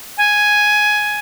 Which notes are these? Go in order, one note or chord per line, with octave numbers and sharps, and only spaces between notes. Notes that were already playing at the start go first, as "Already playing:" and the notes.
G#5